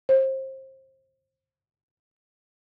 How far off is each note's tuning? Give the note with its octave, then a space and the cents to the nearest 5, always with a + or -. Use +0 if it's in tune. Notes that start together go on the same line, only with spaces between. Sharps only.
C5 +30